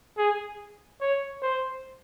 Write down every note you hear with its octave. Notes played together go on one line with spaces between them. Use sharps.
G#4
C#5
C5